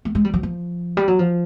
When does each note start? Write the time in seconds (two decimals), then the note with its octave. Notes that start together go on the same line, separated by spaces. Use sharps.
0.05 A3
0.15 G#3
0.24 G3
0.34 F#3
0.43 F3
0.97 G3
1.08 F#3
1.19 F3